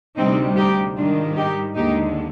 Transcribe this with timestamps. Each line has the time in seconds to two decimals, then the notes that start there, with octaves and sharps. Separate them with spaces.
0.18 D2 C3 G3 C4 D#4
0.57 D#4 G4
0.97 G#2 D#3 G3 D4 F4
1.37 D#4 G4
1.76 D#2 D3 G#3 D#4 G4